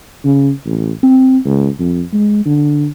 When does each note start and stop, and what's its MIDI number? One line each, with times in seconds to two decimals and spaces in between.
0.24 0.51 49
0.65 0.91 33
1.03 1.37 60
1.45 1.68 37
1.79 2.02 41
2.13 2.45 56
2.45 2.88 50